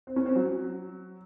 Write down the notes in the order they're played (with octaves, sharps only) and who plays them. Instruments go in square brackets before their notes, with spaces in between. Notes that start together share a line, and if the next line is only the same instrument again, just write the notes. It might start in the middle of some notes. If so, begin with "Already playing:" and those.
[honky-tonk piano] C4
C#4
C4
F#3